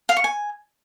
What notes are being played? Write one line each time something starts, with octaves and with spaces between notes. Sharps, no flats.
F5
C#6
G#5